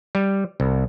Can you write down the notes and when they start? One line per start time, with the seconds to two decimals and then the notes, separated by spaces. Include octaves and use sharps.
0.15 G3
0.60 C2